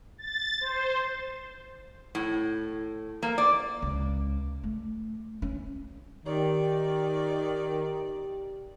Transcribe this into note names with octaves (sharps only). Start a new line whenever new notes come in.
A6
C5
A2
A#3
D5
C#2
A3
C#4
D#3 G4 D5 G5